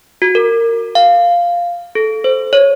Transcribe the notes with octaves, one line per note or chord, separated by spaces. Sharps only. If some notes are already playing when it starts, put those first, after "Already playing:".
F#4
A#4
F5
A4
C5
C#5